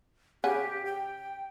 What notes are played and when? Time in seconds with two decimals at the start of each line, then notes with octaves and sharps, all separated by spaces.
0.44 C#3 G4 F#5 G#5
0.86 G5